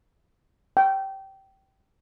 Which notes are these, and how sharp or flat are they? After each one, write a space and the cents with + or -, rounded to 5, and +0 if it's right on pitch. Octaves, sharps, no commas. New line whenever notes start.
G5 -20